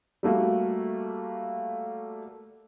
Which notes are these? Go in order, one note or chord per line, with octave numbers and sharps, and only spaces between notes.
G3 A3 A#3 F#4